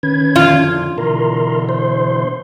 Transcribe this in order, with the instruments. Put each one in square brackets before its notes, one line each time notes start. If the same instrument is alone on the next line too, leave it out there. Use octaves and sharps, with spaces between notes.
[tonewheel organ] D#3 C#4 G#6 [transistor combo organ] B4
[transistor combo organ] F2 D3 F3 [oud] F4
[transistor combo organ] B2 D3 E3 [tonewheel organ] A#4 A#5 C6
[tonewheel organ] C5 C6